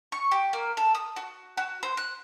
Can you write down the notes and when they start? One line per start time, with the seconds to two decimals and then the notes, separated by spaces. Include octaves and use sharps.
0.12 C#6
0.32 G4
0.53 A#3
0.77 A4
0.95 D#6
1.16 F#4
1.57 F#4
1.83 C5
1.97 F#6